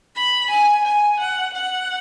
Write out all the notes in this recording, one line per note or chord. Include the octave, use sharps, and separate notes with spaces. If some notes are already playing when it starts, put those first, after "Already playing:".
B5
G#5
G#5
F#5
F#5